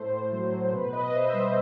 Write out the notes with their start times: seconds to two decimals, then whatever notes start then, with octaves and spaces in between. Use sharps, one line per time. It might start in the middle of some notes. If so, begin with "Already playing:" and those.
Already playing: A2 A3 C5
0.12 A2
0.32 F#3
0.52 A2
0.73 B2 B4
0.93 B2 B4 D#5
1.13 B2 C5 E5
1.33 G3 C5